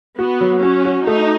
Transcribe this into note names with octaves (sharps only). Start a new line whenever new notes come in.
B3 F#4
F#3
C#4 F#4
F#4
A3 D#4